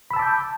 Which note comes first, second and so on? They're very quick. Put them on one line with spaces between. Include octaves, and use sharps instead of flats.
B5 E6 A5 D6 G6